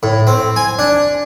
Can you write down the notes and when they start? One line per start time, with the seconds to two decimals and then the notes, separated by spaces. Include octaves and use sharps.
0.03 A2
0.27 C4
0.56 G#5
0.79 D4